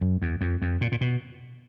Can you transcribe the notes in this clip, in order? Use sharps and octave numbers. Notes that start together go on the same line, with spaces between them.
F#2
E2
F2
F2
A#2
A#2
B2